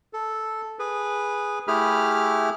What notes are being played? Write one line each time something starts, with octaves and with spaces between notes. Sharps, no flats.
A4
G#4 B4
A3 E4 G4 G#4 B5 F6